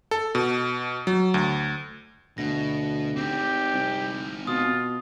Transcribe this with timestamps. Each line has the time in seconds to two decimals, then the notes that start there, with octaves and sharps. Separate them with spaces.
0.11 A4
0.35 B2
1.07 F#3
1.34 D2
2.38 D2 B2 A#6
3.16 C4 D#4 G4
3.74 C2
4.47 B2 F4 D#6